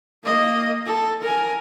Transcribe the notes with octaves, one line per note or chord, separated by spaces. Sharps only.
A#3 D#5
A4
A#4 G#5